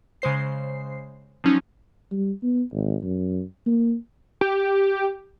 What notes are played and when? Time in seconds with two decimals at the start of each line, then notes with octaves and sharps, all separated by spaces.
0.22 C#3 G#3 C5 C7
1.44 F3 F#3 C#4 D#4
2.12 G3
2.43 B3
2.73 G#1
3.03 F#2
3.66 A#3
4.41 G4